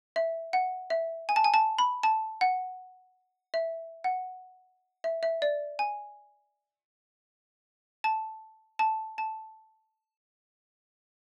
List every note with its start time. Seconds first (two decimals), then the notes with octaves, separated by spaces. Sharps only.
0.16 E5
0.53 F#5
0.90 E5
1.29 G#5
1.36 A5
1.44 G#5
1.54 A5
1.79 B5
2.03 A5
2.41 F#5
3.54 E5
4.04 F#5
5.04 E5
5.23 E5
5.42 D5
5.79 G#5
8.04 A5
8.79 A5
9.18 A5